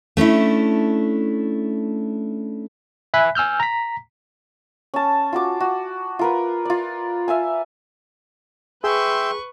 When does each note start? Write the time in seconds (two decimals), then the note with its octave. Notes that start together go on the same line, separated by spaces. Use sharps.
0.17 A3 C#4 D4 E4
3.14 E5 G#5 B5 F#6 B6
3.35 G#5 E6 F6 G6
3.60 A#5 B6
4.94 C#4 A5
5.33 F4 F#4 D6
5.60 F#4
6.19 F4 A#4 B4
6.65 F4 D5
7.28 E5 F5 G#5
8.84 G#4 B4 E5 G5 C6 C#6